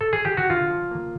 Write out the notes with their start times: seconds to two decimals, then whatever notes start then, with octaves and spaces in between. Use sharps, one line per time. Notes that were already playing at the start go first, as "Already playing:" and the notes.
0.01 A4
0.13 G#4
0.25 G4
0.37 F#4
0.50 D3 F4
0.70 F3
0.91 A#3